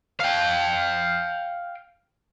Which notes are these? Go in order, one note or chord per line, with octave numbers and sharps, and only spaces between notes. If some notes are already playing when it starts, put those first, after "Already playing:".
F5 G5